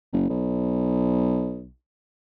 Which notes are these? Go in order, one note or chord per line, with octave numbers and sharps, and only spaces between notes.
F#1
B1